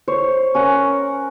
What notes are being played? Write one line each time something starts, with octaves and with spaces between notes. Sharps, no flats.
C5 C#5
C#4 A#4 F#5